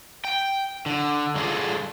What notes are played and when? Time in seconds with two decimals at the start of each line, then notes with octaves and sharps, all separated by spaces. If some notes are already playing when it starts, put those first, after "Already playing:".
0.25 G5
0.86 D3
1.35 G2 D3 G#3 F4 G#4 A4